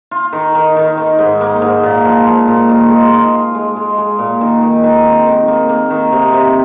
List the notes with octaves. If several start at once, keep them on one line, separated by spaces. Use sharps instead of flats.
F4
D#3
D#3
D#3
D#3
G#2
A#3
G#2
A#2
F3
F3
A#2
D#3
G#3
F4
F4
G#3
G#3
G#3
A#2
D#3
D#3
D#3
C4
D#3
A#3
A#3
D#3
C3
C3